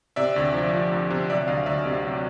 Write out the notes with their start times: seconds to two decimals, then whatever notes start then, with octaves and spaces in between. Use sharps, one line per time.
0.16 C3 D5 E5
0.36 D2
0.54 F3
0.73 F3
0.92 D2
1.10 C3
1.30 F#3 D5 E5
1.48 D2 D#5 F5
1.66 D2 D5 E5
1.86 C3
2.04 F#3